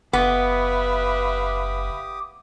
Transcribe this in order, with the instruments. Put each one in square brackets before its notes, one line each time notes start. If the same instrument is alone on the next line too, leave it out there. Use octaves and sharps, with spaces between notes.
[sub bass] F#1 [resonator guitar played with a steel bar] B3 [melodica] G4 D6 D#6 [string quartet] B4 E5 F5